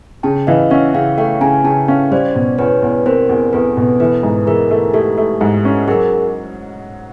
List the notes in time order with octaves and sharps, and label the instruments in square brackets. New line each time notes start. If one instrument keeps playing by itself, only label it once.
[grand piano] C#3 [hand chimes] G5 A5
[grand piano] E3 [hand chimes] D#5 F5
[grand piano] C#4 [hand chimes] E5 F#5
[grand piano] C#3 [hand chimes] F5 G5
[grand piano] A3 [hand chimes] F5 G5
[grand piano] C#3 [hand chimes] G#5 A#5
[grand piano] C#3 [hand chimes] G5 A5
[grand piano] C#4 [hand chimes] F5 G5
[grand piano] G3 [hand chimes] C5 D5
[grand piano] B2
[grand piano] E2 [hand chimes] B4 C#5
[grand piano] E2
[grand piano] C4 [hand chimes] A#4 C5
[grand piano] E2
[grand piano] E2 [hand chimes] A4 B4
[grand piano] B2
[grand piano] E3 [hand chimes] A4 B4
[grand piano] G#2
[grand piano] E3 [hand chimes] G#4 A#4
[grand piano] A3
[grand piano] A3 [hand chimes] G4 A4
[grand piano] A3
[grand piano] G#2 [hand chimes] G4 A4
[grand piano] C#4
[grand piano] F#3 [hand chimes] G#4 A#4